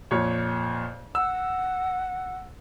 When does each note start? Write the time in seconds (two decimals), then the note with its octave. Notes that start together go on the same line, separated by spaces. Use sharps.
0.11 F2 A#2 C#5
1.15 F#5 E6